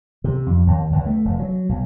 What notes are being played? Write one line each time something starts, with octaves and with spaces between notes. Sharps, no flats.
C3
F2
D#2
C#2
A3
F1
F#3
B1